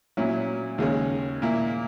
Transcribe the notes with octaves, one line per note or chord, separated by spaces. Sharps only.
A#2 F#3 C#4 E4
D#2 C#3 G#3 C#4
A#2 A#3 E4